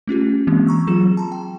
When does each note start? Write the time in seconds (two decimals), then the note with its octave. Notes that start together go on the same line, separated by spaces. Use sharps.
0.07 A3 C#4 F4 G4
0.47 E3 G#3 A#3 C4
0.67 A#5 C#6 E6
0.87 F#3 F4 G#4 E7
1.17 A5 A#5 C6
1.32 G5